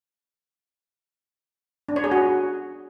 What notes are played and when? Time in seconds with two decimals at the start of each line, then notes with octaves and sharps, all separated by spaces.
1.89 D4
1.96 C#5
2.04 G#4
2.11 F#4